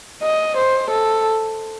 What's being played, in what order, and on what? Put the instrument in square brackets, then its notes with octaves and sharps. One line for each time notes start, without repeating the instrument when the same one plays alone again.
[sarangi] D#5
C5
A4